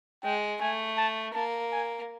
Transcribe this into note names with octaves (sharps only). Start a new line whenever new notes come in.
G#3 G5
A3 G#5
A5
A#3 A5
G#5